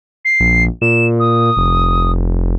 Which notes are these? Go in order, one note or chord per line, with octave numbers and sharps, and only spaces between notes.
C7
A#1
A#2 E7
D#6
F1